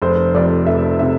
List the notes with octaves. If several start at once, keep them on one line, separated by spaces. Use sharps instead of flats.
F1 C5
F2 C3 D5
F1 E5
C3 E5